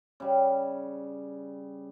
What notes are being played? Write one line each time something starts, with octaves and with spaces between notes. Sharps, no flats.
C#3 G3